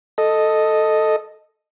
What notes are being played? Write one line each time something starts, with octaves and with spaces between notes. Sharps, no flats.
A4 D#5